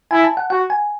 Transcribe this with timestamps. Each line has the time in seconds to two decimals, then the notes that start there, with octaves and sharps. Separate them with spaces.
0.11 E4 G#5
0.24 A5
0.37 F#5
0.50 F#4 F#5
0.70 G#5